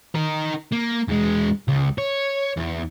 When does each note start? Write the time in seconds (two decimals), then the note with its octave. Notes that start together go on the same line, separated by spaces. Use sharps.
0.15 D#4 A#4
0.72 A#3
1.09 E2 G#3
1.68 C#2
1.98 C#5
2.57 E2